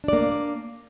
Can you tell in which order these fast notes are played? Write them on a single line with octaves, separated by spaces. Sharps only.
D4 D5 A#3